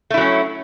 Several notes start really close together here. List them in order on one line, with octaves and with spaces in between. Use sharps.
A3 E4 F#3 C#4